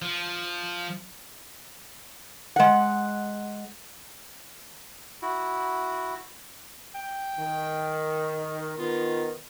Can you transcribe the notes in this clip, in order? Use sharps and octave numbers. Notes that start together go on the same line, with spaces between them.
F3
G#3 F#5
E4 F#4
G5
D#3
D#3 B3 F4